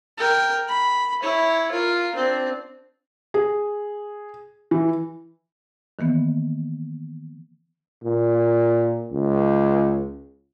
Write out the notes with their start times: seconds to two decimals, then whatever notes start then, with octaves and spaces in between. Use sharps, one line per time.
0.17 A#4 G5
0.68 B5
1.23 E4 C#5
1.71 F4 A#4
2.15 C4 D4
3.34 G#4
4.71 E3
5.99 D#3 E3 A#3 B3
8.04 A#2
9.12 C#2